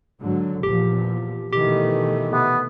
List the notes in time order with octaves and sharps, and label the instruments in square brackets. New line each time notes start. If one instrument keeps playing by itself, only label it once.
[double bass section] G#2 D3 F#3
[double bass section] E2 A#2 F3 [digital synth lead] G4
[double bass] B2 D#3 [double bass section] E3 A3 [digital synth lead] G4
[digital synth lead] C3 [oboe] B3